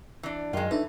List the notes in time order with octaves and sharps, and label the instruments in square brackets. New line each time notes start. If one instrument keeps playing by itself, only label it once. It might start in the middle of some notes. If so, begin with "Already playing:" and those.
[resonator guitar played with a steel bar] E3 D4
[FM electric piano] F#2 F#3 G5 [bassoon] D#3 [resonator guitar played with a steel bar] G#3 F4
[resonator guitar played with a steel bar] E3 [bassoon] A3 [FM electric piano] D4 D#4 B4